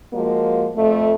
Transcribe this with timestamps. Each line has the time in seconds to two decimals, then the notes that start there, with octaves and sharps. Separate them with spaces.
0.13 F3 G#3 A#3 F#4
0.76 F2 A3